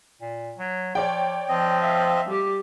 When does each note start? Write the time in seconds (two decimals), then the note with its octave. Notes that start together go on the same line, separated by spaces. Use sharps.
0.21 A#2
0.59 F#3
0.95 F3 C#5 D5 G5
1.49 F3 C4 D#5
1.80 E5 F5
2.27 G3 G4